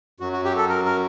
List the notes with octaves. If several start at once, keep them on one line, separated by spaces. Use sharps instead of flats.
F#2 F#3 F#4
F#4
G4
A4
A#4
A#4